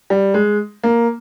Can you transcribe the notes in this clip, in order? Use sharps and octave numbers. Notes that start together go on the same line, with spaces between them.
G3
G#3
A#3